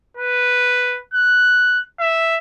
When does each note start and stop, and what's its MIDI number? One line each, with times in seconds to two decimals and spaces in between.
0.17 0.99 71
1.14 1.81 90
2.00 2.38 76